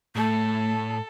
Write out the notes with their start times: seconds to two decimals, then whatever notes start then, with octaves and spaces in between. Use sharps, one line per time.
0.16 A2 A3 A4